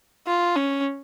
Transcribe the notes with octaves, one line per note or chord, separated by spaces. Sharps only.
F4
C#4